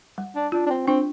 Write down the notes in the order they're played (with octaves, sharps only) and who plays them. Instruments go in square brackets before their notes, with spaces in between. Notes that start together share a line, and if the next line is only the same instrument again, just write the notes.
[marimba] G3
[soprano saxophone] D4
[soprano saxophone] D4 [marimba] F4
[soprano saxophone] D4
C4
[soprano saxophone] C4 [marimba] D4